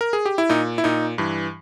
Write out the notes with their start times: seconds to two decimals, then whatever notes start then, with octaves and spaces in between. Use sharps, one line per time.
0.01 A#4
0.13 G#4
0.26 G4
0.38 E4
0.49 A#2 D#4
0.78 E4
0.84 A#2 D#4
1.18 G2 E3